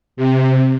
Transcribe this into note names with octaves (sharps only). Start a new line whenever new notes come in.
C3